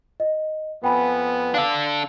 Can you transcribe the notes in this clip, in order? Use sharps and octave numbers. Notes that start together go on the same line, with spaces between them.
D#5
F2 B3 G5 G#5 B5
D4 A4 F5